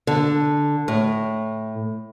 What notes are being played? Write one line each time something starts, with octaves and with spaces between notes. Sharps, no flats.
D3
A2